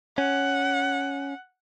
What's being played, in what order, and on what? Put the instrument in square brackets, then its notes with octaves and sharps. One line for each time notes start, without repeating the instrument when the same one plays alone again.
[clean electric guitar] C#4 [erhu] F#5